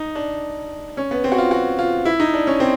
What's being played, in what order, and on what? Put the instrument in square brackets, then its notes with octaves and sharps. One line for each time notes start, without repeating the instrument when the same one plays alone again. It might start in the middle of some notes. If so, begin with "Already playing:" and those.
Already playing: [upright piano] D#4
D4
C#4
B3
C4
F#4
F4
F#4
F4
E4
D#4
D4
C#4
C4